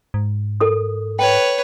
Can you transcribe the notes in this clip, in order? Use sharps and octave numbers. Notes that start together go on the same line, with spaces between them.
G#2
A4 A#4 D#6
B4 C#5 G5